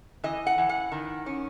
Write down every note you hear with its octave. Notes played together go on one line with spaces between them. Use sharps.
E3 D#5
F#5
E3
F#5
D#3
C#4